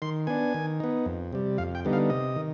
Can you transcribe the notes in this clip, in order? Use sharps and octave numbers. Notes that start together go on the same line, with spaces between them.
D#3 C6
B3 D4 G#5
D#3
B3 D#4
F2
C3 G3
F2 F5
G5
D3 G3 B3 D#4
F5
C3 D#5
D#3